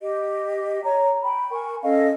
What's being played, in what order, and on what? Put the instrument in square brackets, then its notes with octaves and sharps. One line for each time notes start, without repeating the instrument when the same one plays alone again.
[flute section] G4 D#5
C#5 A#5
G5 B5
A#4 G#5 C#6
C#4 A4 D#5 F5